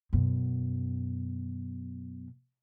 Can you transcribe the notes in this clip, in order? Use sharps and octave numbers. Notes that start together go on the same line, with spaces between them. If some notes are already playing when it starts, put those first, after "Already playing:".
F#2 B2